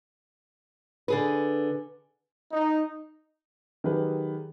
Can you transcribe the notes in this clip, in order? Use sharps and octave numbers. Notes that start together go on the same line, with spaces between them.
D3 G#4 B4
D#4
D#3 F#3 G4 G#4 B4